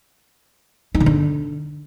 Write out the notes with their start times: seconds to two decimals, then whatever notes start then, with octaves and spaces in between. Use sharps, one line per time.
0.95 D#4
1.00 C#3
1.06 D3